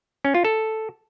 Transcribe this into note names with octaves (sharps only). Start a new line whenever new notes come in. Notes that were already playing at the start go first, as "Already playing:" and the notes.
C#4
F4
A4